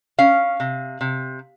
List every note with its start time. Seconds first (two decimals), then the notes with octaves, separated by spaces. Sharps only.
0.19 C#4 F5
0.60 C3
1.01 C3